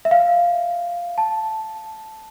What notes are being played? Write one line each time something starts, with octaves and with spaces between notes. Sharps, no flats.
E5
F5
A5